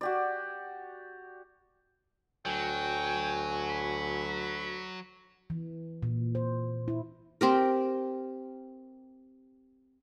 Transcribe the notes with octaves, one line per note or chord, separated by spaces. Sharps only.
F#4 G4 D5
D2 F#3 G5 G#5
B5
E3
A#2
C5
E4
C4 G4 A#4